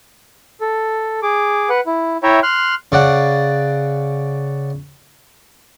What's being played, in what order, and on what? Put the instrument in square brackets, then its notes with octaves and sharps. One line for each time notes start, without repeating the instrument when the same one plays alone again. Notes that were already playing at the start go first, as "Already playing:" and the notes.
[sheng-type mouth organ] A4
G#4 D6
B4 F#5
E4
E4 C#5 E5 G5 A#5
C6 F6 F#6
[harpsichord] C#3 D5 F#5